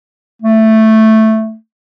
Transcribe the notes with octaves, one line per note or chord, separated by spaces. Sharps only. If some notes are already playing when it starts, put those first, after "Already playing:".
A3